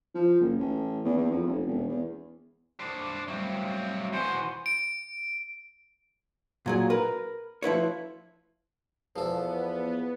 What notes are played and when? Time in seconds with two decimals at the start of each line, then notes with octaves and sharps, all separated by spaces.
0.15 F3
0.41 F#1
0.59 A1
1.05 E2
1.17 E2
1.31 F2
1.47 F1
1.66 E1
1.89 E2
2.80 D4 C5 D6
3.28 F#3 G3 A3 C4 F5
4.13 E3 F#4 C5 F#5 G#5 C6
4.66 D7
6.66 A#2 F#3 G#4
6.90 A#4 B4
7.62 F3 E4 B4 C#5
9.16 E2 F3 B3 A4